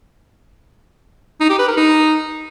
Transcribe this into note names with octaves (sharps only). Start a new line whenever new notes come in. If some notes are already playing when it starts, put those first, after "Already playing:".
D#4
G4
B4
A#4
D#4